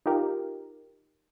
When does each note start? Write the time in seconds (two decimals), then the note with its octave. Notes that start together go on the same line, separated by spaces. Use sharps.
0.06 D#4 F4 G4 A#4